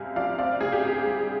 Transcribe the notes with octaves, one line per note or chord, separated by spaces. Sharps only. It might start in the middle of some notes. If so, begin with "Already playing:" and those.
Already playing: C2 C3 F5 G#5
F3 D5 F5
C4 D5 F5
C3 G#4
G4
D2 G#4
G3